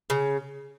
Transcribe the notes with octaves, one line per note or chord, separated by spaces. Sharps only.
C#3